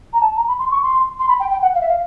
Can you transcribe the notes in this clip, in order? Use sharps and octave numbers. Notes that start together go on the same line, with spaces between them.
A#5
A5
A#5
B5
C6
C#6
C6
C6
B5
G5
G5
F#5
F5
E5
F5